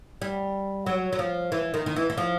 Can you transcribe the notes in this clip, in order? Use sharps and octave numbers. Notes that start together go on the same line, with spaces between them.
G3
F#3
F#3
F3
E3
D#3
D#3
E3
E3
F3